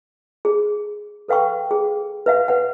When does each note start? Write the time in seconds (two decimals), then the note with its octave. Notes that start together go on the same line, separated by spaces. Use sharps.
0.45 G#4
1.28 A4 B4 F5 G5 C#6
1.71 G#4
2.26 B4 E5 F5
2.48 B4 F#5